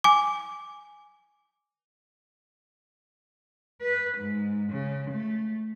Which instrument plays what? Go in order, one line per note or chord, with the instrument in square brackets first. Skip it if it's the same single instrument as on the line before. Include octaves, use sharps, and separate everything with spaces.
[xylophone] G#5 D6
[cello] B4
G#2
C#3
A3